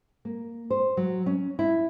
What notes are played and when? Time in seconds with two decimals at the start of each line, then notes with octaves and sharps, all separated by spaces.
0.25 A#3
0.70 C5
0.97 F#3
1.26 C#4
1.59 E4